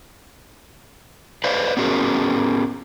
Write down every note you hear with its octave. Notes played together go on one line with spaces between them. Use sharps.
B4 C5 D5 F5
B3 C#4 F#4 G#4 A#4